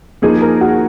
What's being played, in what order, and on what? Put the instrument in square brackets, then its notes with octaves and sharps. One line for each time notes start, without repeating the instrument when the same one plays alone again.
[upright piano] F3 A#3 D#4 [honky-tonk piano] G#4
[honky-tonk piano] A#4
F#4